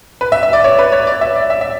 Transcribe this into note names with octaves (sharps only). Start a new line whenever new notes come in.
B4
E5
E5
D5
C#5
B4
C#5
D5
E5
D5
E5
E5